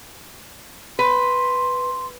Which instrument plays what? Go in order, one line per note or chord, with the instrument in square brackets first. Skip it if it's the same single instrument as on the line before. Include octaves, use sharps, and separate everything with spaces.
[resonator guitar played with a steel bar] B4 [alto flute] C6